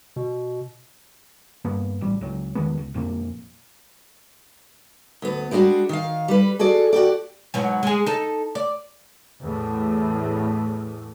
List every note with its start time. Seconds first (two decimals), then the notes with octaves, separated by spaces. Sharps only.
0.16 B2
1.64 G2 A#3 B3
2.01 A1 G3
2.21 C#2 F#3
2.55 E1 D#3 G#3 B3
2.79 C#2
2.94 B1 F2 A#2 A#3
5.22 D2 B3
5.51 G3 G#3 D4 F4 F#4
5.89 D#3 F5
6.28 G3 B4
6.59 F#4 G#4 A4 D5
6.93 F#4 G4 D5
7.54 G#2 B2 F#3
7.83 G#3 G#4
8.06 D#4 A4
8.55 D5
9.42 E2 A2